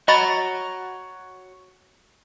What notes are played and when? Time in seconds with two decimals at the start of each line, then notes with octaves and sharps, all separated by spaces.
0.08 F#4 C#5 D#5 A#5 B5 A6